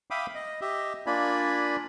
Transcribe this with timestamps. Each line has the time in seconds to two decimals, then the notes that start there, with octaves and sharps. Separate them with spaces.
0.11 E5 F5 G5 B5 D6 D#6
0.35 D#5
0.61 G4 D#5 E5
1.06 A#3 D4 F4 D5 G#5 B5